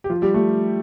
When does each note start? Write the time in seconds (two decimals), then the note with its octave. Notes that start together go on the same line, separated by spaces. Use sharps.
0.04 G4
0.10 F3 F4
0.22 G3 G4
0.34 A3